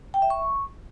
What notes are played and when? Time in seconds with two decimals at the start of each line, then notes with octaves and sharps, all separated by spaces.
0.14 G5
0.22 E5
0.30 C#6